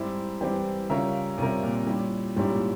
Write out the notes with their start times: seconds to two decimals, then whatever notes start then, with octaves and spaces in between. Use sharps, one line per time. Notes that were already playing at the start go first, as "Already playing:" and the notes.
Already playing: G#2 G3 C4 E4 G4
0.41 E3 G3 C4 E4 G4
0.89 C#3 G3 C#4 F4 A#4 E5
1.38 C3 G3 C#4 F4 A#4 E5
1.63 A#2
1.87 G3 C#4 E4 G4
2.36 G#2 G3 C#4 E4 G4
2.52 A#2